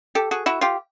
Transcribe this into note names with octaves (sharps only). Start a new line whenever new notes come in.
G4 A4
F#4 G#4
E4 F#4
F4 G4